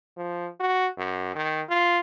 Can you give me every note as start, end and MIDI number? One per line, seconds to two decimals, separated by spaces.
0.17 0.48 53
0.60 0.88 66
0.98 1.30 42
1.35 1.62 51
1.69 2.00 65